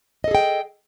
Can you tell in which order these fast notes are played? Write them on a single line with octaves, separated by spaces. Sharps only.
D#5 A4 G#4 G5